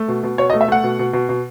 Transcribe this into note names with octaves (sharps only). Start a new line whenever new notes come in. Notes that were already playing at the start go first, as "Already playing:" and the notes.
Already playing: A3
B2
B2
B2 C#5
D#5
A3
E5
A3 F#5
B2
B2
B2
B2